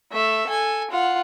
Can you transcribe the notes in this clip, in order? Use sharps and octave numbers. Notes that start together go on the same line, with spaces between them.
A3 E5
A4 G#5
F4 F#5